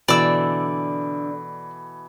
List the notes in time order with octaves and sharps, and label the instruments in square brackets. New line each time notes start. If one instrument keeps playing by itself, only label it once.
[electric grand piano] B2 E3 [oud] D3 [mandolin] D5 E6 [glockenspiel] B5